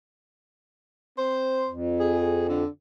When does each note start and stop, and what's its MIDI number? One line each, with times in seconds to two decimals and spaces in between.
1.17 1.70 60
1.17 1.70 72
1.68 2.63 41
1.99 2.46 68
2.48 2.67 50